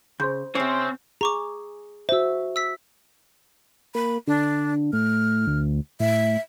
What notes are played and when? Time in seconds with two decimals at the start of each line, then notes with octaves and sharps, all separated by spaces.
0.20 C#3 C5 C6 G6
0.55 C3 C4 C#4 C#5
1.21 G#4 A#5 C#6 D6
2.09 F#4 C5 E5 E6
2.56 E6 B6
3.95 A#3 B5
4.27 D3 D4
4.93 A2 F6
5.47 D2
6.00 A2 E5